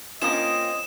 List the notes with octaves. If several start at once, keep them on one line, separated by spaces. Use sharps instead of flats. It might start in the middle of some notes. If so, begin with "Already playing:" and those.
A#3 C4 C#4 F4 D#5 D#6 E7